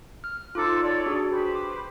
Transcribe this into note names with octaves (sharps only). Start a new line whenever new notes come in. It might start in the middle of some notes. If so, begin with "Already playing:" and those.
F6
D#4 F4 A4 C5 D6
A4 C#5 D5
D4 F#4 G#4
G4 B4 C5
D6